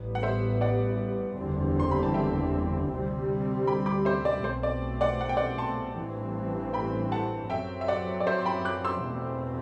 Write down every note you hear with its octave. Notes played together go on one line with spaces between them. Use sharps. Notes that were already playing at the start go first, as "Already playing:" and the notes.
Already playing: A1 A2 G3 B3
F#5
C5 E5
D5 F#5
F#1 E2 D3 G3 C4
C6
B5
A5
E5 G5
D2 C3 G3 C4
G5 B5
B5 D6
C5 E5
D5
B1 B2 A3 C4 C5
D5
D5 F#5
F#5
G5
D5 F#5
A5 C6
A1 G2 E3 A3 C4
G5 B5
F#5 A5
F#2 F#3 C4 E5 G5
E5
D5 F#5
D5
C5 E5
C6
G5 B5
D6 F#6
C6 E6
E2 B2 A3 C4